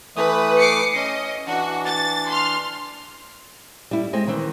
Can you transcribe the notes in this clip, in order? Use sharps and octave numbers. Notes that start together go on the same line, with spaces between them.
E3 A3 B4 D#6
D6 C7 C#7
C#4 D#5
E3 D4 F#4
A6
C6 F6
G3 E4
G#3 C4
D#3 E3 C4